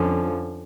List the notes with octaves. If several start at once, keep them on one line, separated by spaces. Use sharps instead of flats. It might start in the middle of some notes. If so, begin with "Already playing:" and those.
Already playing: F2 D3 F3 C#4